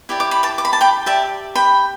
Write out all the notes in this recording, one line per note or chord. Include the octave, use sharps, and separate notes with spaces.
E4 G4 D5
D6
B5
A5 D6
D6
B5
A5
G5 B5
G4 D5 E5 A5
G5 B5